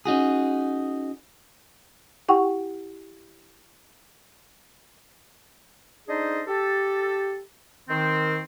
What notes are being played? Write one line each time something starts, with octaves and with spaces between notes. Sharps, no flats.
C#4 D#4 F#4 G#4
E4 G4 F#5 G5 C#6
D4 D#4 G#4 A4 C5 D#5
G4 A4
D#3 C4